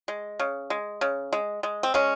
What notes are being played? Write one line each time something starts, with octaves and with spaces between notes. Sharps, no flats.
G#3
C#3
G#3
C#3
G#3
G#3
C4
G#3 C#4